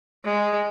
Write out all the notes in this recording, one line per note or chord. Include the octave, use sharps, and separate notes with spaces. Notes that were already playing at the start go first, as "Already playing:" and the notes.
G#3